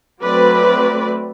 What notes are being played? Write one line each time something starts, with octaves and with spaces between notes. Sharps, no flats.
F#3 A3 C4 B4 D5